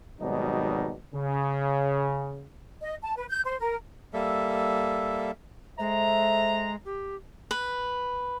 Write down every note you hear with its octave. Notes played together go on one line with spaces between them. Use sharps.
G#1 B2 F#3 G3 D#4 D5
C#3
D#5
A5
B4
G6
C5
A#4
G3 A#3 A4 E5
G#3 A4 C5 E5 A#5
G4
B4